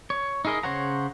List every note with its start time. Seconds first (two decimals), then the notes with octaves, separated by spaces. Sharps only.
0.10 C#5
0.45 D#4 E4 G#4 A#4 D#5
0.63 C#3 C5 C#5 F#5 A#5